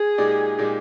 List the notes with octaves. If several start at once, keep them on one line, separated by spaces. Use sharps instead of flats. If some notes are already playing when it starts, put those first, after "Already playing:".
Already playing: G#4
A#2 G#3 D#4 G4 D5
A#2 G#3 D#4 G4 D5